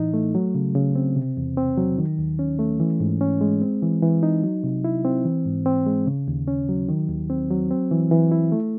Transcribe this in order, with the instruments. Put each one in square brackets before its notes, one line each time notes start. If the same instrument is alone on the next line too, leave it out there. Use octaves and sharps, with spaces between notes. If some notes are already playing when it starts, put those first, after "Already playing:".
Already playing: [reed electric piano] A2 E3 D#4
A3
F#3
C#3
C#3
C4
C3
E2
C4
F#3
D#3
D#2
C#4
A3
E3
G#2
C#4
G#3
C4
E3
E3
D#4
F#3
C3
E4
C4
E3
G#2
C4
G#3
C#3
D#2
C#4
F#3
D#3
D#2
C4
F#3
C4
E3
E3
E4
A3